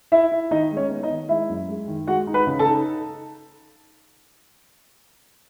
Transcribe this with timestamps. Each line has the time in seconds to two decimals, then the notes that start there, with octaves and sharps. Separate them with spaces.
0.12 E4 E5
0.32 E4
0.51 D#3 D#4 D#5
0.71 G#3
0.77 C#4 C#5
0.90 B3
1.03 D#4 D#5
1.10 D#3
1.29 G#3 E4 E5
1.50 F#2
1.69 G#3
1.88 D#3
2.07 G#3 F#4 F#5
2.27 D#4
2.34 B4 B5
2.47 C#3
2.59 A4 A5
2.66 D#4